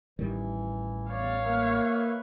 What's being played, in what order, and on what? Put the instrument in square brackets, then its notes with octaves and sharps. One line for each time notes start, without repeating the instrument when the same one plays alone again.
[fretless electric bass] A1 D#3 G3 [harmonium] E3
[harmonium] E2 D5 [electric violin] C#5 F5
[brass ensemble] A#3 [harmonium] B4 E5